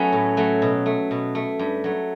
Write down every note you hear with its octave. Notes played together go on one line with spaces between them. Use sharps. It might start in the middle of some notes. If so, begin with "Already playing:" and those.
Already playing: F#3 A3 B3 C#4
A2
F#3 A3
B2
A3
B2
A3
G2
F#3 A3